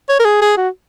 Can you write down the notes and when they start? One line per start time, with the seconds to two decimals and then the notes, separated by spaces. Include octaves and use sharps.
0.09 C#5
0.20 A#4
0.25 G#4
0.42 G#4
0.57 F#4